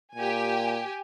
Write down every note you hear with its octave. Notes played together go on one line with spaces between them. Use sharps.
A#2 G4 G#5